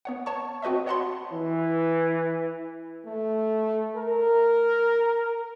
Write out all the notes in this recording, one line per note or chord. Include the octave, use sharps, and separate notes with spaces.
B3 C#5 F#5
C#5 A5 C#6
C4 F#4 B4 D#5 E5
C#5 D#5 F#5 A5 B5 C6
E3
A3
A#4